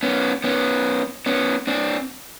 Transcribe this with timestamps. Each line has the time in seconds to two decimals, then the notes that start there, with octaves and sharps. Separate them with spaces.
0.03 B3 C#4
0.44 B3 C#4
1.26 B3 C#4
1.67 C4 D4